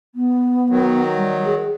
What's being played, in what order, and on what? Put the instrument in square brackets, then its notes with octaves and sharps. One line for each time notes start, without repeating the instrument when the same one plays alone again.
[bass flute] B3
[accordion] D#3 F#3
[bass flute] G3
G#4